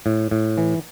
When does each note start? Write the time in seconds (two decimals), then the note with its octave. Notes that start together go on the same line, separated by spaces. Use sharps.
0.06 A2
0.31 A2
0.58 E3